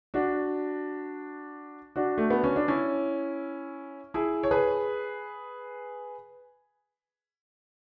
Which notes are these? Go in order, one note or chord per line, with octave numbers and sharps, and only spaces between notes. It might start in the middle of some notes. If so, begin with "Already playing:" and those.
D4 F#4
D4 F#4
A3
B3
C#4
D4
C#4 E4
E4 G#4
C#5
G#4 B4